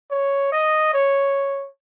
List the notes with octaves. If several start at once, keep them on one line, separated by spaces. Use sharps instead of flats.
C#5
D#5
C#5